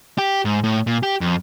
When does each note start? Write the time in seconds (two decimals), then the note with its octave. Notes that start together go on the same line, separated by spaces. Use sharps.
0.18 G4
0.45 G#2
0.64 A2
0.87 A#2
1.03 G4
1.21 F2